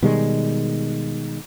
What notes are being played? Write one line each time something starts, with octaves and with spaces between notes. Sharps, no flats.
B2 D#3 G3 G#3